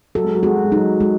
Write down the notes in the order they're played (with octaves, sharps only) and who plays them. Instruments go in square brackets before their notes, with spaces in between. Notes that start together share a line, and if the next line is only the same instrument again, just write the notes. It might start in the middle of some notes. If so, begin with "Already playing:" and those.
[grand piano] F#3 [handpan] A4
[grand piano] G#3
F#3
[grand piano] G#3 [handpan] F#4
[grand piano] F#3
G#3
[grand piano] F#3 [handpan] D#4
[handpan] G#3